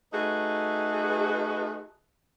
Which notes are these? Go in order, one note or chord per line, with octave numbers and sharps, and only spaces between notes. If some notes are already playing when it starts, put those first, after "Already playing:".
A3 D#4 F#4 G#4 B4